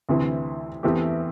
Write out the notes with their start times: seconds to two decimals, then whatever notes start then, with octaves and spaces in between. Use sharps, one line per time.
0.09 D2 C3 E3 C4
0.83 E2 E3 A3 C4 G4